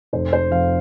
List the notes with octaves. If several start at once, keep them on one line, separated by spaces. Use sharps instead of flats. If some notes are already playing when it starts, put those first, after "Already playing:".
F1 C5
C5
F2 F5